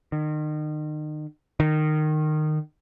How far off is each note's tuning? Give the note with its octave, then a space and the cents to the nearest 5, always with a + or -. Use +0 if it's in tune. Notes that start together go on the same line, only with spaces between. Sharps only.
D#3 -35
D#3 -20